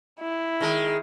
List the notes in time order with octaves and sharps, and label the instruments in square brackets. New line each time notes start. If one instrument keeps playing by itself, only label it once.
[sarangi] E4
[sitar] D#3 G#3